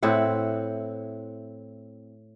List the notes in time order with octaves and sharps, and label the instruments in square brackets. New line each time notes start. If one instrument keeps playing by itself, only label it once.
[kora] A2 C4 E4 F#5